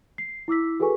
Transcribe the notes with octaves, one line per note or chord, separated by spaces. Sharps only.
C7
E4 D6 E6 B6
F#4 G#4 A4 B4 G#5 C#6